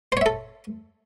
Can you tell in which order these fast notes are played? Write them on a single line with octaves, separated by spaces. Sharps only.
C5 C#5 E5 A4